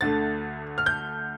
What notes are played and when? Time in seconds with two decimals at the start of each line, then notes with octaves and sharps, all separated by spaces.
0.01 D2 D3 A3 A6
0.78 F6
0.86 G6